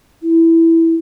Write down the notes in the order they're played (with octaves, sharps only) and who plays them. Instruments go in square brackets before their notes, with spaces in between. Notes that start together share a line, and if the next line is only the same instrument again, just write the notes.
[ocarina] E4